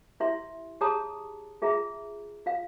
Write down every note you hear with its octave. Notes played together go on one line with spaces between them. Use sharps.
E4 G4 E5 C6
G4 G#4 C#5 A5 A#5 D#6
F4 G#4 E5 A#5 B5
F4 F5